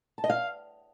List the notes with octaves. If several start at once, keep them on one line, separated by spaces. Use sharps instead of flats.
A5
D#5
F5